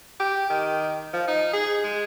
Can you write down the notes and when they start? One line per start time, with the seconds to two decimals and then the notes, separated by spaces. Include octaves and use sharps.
0.20 G4
0.50 D#3
1.13 F3
1.28 D#4
1.53 G#4
1.84 G#3